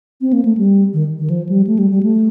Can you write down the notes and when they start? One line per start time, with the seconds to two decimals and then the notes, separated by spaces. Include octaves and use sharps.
0.21 C4
0.33 A#3
0.45 A3
0.57 G3
0.93 D#3
1.18 D#3
1.30 F3
1.49 G3
1.67 A3
1.79 G3
1.91 G3
2.03 A3